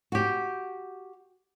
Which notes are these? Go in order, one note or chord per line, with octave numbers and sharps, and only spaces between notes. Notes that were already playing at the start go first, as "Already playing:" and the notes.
F#4 G4